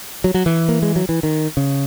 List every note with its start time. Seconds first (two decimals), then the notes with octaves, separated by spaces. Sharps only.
0.24 F#3
0.34 F#3
0.46 E3
0.69 A#3
0.82 G#3
0.96 F#3
1.09 E3
1.23 D#3
1.57 C#3